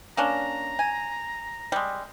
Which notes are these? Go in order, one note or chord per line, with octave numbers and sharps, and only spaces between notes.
A#3 C#4 D4 A#5
G#5
G3 G#3